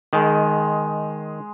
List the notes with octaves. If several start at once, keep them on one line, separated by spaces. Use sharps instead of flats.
D#3 G#3 D#5